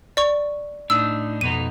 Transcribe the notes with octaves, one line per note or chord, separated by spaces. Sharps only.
D5 C#6
A2 D4 D#4 E6
F2 B2 D#4 D#7